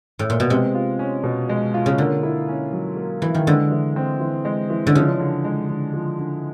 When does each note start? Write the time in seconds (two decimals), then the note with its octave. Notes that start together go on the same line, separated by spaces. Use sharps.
0.19 A2
0.30 A#2
0.40 B2
0.50 C3 G#3
0.75 F4
0.99 C#4
1.24 B2
1.49 G#3
1.74 F4
1.86 C#3
1.98 D3 A#3
2.23 E4
2.48 C#4
2.73 F#3
2.97 A#3
3.22 E3 E4
3.35 D#3
3.47 D3 G#3
3.71 E3
3.96 C4
4.20 E3
4.45 G#3
4.70 E3
4.87 D3
4.95 C#3 F3
5.19 D3
5.45 G#3
5.69 D3
5.93 F3
6.19 D3